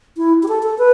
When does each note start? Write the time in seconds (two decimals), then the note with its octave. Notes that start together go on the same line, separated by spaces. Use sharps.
0.17 E4
0.43 G4
0.48 A4
0.63 A4
0.78 B4